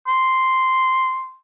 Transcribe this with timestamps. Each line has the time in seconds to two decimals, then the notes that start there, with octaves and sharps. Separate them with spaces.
0.08 C6